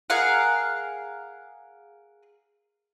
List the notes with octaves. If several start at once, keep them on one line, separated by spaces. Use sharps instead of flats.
G#4 A#4 F5 F#5